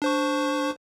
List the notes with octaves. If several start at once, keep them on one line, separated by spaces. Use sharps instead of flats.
D4 C5 C#6